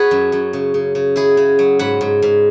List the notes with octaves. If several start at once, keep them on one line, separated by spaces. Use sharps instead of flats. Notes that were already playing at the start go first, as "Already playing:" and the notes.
Already playing: F#4 G#4 B4 C#5
F#2
F#2
C#3
C#3
C#3
F#3 E4 G#4
C#3
F#3
G#2 F#5 B5
G#2
G#2